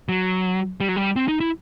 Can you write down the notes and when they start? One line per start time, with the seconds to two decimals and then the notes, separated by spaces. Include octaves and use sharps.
0.09 F#3
0.80 G3
0.88 F#3
0.96 G3
1.16 C4
1.28 D#4
1.40 E4